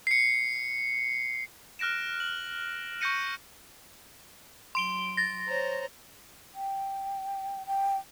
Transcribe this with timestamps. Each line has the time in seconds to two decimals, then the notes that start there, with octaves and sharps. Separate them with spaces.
0.07 C7 C#7
1.79 F6 F#6 A#6 D7 E7
2.20 F#7
3.01 C#6 F6 G6 A#6 C#7 D#7
4.75 F#3 C6 D7 G7
5.17 A6 A#6
5.47 C5 C#5 A#5
6.54 G5
7.66 G5